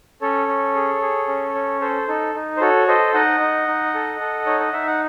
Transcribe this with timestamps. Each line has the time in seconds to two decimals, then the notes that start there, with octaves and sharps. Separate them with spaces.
0.21 C#4 A4 C#5
0.48 C#4
0.75 G#4
1.01 G#4
1.28 C#4
1.55 C#4
1.81 A4 C5
2.08 D#4 A4
2.35 D#4
2.57 C5
2.61 F#4 A4 C#5
2.88 A4 C5 D#5
3.14 D#4 D#5 F#5
3.40 D#4
3.68 D#4
3.94 A4
4.20 A4
4.46 D#4 C#5
4.60 D#5
4.73 D#4 E5
4.87 F#5